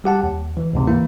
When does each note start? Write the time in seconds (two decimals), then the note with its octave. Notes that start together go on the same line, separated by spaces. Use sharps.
0.04 G3 G4 F#5 A5
0.23 D#2
0.57 E3
0.73 D2 G#2 C3
0.87 E3 A#3 E4